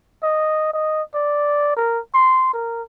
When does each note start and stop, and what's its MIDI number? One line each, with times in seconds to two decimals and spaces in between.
0.23 0.69 75
0.73 1.03 75
1.14 1.76 74
1.76 1.99 70
2.14 2.50 84
2.53 2.82 70